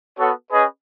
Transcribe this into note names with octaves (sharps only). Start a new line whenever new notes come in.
B3 F#4 A4 C#5
C#4 G#4 B4 D#5